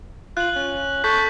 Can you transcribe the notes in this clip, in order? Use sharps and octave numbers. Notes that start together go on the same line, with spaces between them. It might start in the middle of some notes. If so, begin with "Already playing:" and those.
F4 F#6 F#7
C#4
A4 C#6 G6 B6